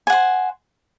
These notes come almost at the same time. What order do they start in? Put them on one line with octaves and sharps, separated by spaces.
G#5 F#5 C5